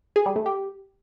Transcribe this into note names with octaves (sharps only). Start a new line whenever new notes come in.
G#4
G3
A3
G4